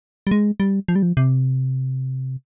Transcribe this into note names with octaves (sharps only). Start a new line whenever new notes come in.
G3
G#3
G3
F3
G3
F3
C3